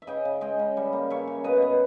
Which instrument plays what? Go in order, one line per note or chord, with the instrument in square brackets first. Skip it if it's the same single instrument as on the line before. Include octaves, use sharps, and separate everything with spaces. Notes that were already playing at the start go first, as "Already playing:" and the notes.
[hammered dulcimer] E5
C#3 D#5 G5
C#3
G#3 D#5 G5
C#3
G3
A#3
C#3 C#5 E5
C#3
B2 B4 D#5
B2